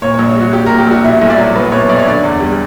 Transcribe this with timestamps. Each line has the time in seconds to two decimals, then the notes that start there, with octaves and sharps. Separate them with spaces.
0.02 A#2 C#5
0.14 A#1 C#5
0.35 G3 F#4
0.53 A#1 G4
0.66 A#2 A#4
0.78 G4
0.87 A#1 F#4
1.04 B2 E4
1.21 B1
1.30 D5
1.38 F#3
1.55 B1 B4
1.72 B2 C#5
1.89 B1 D5
1.99 C#5
2.06 D3 D5
2.23 E2
2.40 G3